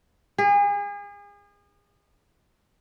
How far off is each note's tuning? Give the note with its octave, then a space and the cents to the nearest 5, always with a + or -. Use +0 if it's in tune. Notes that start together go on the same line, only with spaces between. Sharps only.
G#4 -35